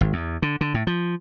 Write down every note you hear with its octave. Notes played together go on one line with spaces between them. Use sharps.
G#1
E2
D3
D3
A2
F3